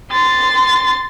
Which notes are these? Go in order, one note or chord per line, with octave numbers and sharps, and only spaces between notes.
C6 A6